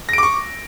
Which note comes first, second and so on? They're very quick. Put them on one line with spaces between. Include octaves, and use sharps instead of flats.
A#6 D7 D6 C#6